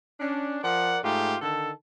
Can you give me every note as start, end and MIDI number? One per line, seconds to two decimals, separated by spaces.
0.20 0.59 61
0.20 0.59 62
0.63 0.99 53
0.63 0.99 70
0.63 0.99 74
0.63 0.99 78
1.04 1.36 44
1.04 1.36 57
1.04 1.36 65
1.04 1.36 67
1.42 1.71 50
1.42 1.71 51
1.42 1.71 69